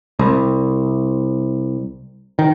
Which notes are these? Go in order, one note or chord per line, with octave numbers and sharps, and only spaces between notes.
C2
D#3